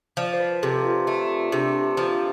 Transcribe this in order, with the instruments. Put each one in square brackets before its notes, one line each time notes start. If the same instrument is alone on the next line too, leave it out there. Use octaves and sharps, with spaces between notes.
[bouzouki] F3 [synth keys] D5
[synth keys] C5
B4
[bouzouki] C3 [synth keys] A4
[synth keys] F4
[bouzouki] A3
[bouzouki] C3 [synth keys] D4
[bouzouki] F3